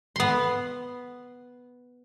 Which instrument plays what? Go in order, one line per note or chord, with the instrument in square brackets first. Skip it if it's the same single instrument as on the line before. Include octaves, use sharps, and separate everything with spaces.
[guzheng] B3 C6